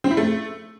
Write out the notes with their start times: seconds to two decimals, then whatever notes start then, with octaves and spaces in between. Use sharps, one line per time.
0.04 C4
0.11 E4
0.17 A3